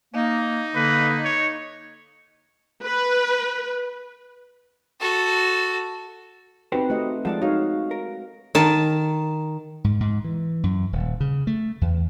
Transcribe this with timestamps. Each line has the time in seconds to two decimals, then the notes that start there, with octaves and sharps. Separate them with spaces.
0.15 A#3 D#4
0.75 D3 A#3 B4
1.24 C#5
2.82 B4
5.00 F#4 A4
6.72 C4 D#4 F#4 G4 B4 C5
6.90 A3 F#4 G4 D#5
7.25 F3 G#3 A4 D5 F#5
7.42 D#4 F#4 C#5 F5
7.91 A#4
8.55 D#3 A5
9.84 G#2
10.00 G#2
10.24 E3
10.64 F#2
10.92 D#1
11.20 C#3
11.47 A3
11.81 E2